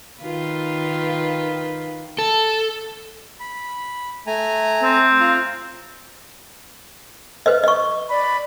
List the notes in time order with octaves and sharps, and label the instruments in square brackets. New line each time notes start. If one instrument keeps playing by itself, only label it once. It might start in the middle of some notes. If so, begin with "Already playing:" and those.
[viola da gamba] D#3 F4 B4
[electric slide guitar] A4
[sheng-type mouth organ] B5
A3 G#5 A#5
[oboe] C4
[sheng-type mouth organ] F4 A#5
[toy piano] B4 C5 D#5
D#5 C#6
[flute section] D5 B5